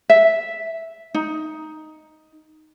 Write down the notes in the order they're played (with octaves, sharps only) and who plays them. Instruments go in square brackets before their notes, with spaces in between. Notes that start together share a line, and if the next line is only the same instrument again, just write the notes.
[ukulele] E5
D#4